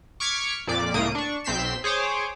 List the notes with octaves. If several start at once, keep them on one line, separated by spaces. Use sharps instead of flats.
C#6 D6 F6 G#6 B6 C#7
F2 A#2 D5 D6
C#2 A2 A#3 D#6 D7
D4 C#6
B1 C4 G6 B6 C7 E7
G#4 C5 C#5 D6